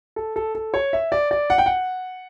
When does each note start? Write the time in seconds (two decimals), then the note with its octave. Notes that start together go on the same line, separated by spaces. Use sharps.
0.16 A4
0.36 A4
0.55 A4
0.74 C#5
0.93 E5
1.12 D5
1.31 D5
1.50 F#5
1.58 G5
1.66 F#5